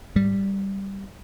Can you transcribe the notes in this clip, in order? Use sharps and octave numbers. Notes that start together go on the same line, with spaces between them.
G#2 G3